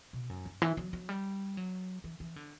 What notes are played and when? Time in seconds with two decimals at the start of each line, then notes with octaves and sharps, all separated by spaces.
0.13 B2
0.30 F#2
0.46 G2
0.62 E3
0.77 F#3
0.93 F#3
1.09 G3
1.57 F#3
2.04 E3
2.20 E3
2.36 D3